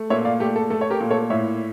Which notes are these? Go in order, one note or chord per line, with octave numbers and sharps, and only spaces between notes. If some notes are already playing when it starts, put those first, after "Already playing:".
Already playing: A3
A#2 C#5 E5
D5 F5
A3 G4
A4
A3 A4
C#5
G4 A#4
A#2
A4 C#5
A2 C#5 E5